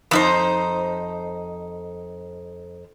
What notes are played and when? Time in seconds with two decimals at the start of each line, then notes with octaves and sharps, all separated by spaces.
0.11 F2 D#4 C5